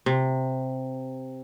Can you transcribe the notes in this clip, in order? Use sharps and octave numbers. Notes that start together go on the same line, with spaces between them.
C3